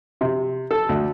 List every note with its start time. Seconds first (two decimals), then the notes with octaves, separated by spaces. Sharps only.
0.21 C3
0.71 A4
0.89 D2